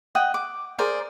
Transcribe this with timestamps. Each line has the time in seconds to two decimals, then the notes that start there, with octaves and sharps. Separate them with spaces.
0.15 D#5 F#5 G5 D#6
0.34 D6
0.78 G#4 A#4 C5 D5